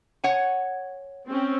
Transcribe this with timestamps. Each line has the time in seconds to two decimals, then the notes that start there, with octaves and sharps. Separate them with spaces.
0.24 C#5 F#5 G#5
1.27 C4 C#4